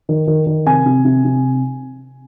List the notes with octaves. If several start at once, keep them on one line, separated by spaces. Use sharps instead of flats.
D#3
D#3
D#3
C3 G#5
C3
C3
C3